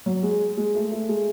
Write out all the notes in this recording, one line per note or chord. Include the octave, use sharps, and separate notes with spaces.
F#3
G#3
G#3
A3
A3
G#3